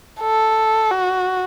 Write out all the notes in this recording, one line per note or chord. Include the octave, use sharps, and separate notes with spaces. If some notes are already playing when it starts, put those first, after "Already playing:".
A4
F#4